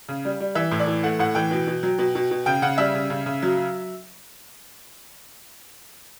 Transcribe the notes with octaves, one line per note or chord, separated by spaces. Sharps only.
C#3
G3
G3
E3 E5
A2
D5
E3
A3 F#5
A2 F#5
E3 G5
B2
B2
F#3
B2
B2
B2
C#3 G5
C#3 F#5
G3 E5
C#3
C#3
C#3
F#3
F#3